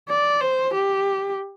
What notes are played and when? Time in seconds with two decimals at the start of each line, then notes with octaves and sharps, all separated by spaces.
0.08 D5
0.41 C5
0.74 G4